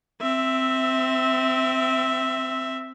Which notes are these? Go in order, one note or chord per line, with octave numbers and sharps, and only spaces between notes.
C4 E5